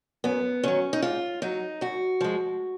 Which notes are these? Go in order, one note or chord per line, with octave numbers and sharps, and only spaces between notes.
F#2 B3
D#3 F#3 C#4
D#4
G#2 F4
F#3 D#4
F#2 F#4
F3 G#3